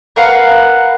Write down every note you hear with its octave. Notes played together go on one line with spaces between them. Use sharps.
A#4 B4 F5 F#5